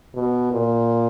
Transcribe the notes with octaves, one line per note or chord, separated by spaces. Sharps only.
B2
A#2